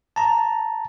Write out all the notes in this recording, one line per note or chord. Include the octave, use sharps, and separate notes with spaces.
A5 A#5